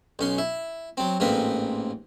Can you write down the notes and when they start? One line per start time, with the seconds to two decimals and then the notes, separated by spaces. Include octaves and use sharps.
0.19 B1 C#4 C6
0.38 E4
0.97 F#3 C4
1.20 A1 G#2 A#3 C4 B4